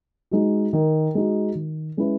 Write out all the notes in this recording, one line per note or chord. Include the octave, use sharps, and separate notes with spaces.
G#3 D#4 F#4
D#3
G#3 D#4 F#4
D#3
G#3 C#4 E4 B4